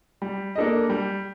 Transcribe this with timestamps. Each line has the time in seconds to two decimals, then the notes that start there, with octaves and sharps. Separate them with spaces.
0.22 G3
0.56 A#3 D4 A4 D#5
0.90 G3